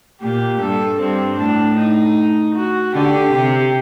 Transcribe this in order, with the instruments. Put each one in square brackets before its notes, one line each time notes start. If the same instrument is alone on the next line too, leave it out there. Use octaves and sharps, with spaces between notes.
[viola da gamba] A#2 [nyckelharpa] G4
[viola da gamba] G2 [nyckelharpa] A4
[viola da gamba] G2 [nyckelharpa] C4
[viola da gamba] A2 [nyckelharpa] D4
[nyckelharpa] D#4
F#4
[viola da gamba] D3 [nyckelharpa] G4
[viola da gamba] C3